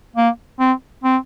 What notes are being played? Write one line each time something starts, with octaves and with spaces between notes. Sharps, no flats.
A#3
C4
C4